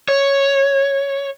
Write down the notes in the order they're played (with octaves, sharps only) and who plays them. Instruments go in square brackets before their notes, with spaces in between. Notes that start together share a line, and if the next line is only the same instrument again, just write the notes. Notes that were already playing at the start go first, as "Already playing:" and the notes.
[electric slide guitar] C#5